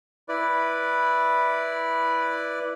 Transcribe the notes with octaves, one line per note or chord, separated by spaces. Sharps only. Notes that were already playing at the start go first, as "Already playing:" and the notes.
E4 B4 D5